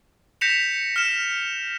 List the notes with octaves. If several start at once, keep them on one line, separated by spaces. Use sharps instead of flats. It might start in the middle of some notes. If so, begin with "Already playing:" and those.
G6 A#6 B6 C#7 E7 F7
F6 E7